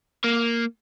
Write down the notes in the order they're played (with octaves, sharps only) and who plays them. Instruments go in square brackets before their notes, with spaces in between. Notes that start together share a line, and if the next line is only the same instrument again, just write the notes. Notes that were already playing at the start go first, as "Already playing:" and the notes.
[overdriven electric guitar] A#3